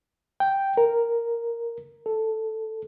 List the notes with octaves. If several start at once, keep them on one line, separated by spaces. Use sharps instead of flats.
G5
A#4
A4